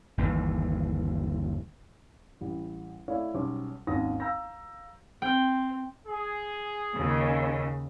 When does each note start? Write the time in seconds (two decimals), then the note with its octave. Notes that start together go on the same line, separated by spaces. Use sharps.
0.18 G1 D#2 E3
2.41 A1 G3
3.08 A3 E4 C#5 D5 F5
3.34 B1 G3 C#4 C5 D6
3.87 G#1 D#2 C#4 D#6 A#6
4.20 F5 A#5 E6 G6 A#6
5.22 C4 G5
6.07 G#4
6.94 D#2 C#3